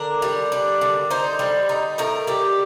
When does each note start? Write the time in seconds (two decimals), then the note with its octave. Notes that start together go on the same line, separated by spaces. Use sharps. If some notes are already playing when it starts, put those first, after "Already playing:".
Already playing: D3 D4 A#4
0.22 G3
0.52 D4
0.81 D3
1.10 D#4 C5
1.39 G3
1.69 D#4
1.98 A2 A#4
2.27 G3 G4